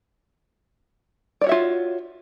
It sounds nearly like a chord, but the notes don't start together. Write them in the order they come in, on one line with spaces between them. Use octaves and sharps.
D5 C#5 F#4 E5 F4